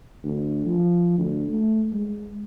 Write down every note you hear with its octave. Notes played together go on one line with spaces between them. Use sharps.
D2
F3
D2
A3
G#3